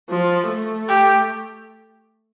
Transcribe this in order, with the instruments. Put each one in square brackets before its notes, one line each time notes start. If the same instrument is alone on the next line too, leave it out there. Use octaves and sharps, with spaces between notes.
[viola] F3
A3
[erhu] G4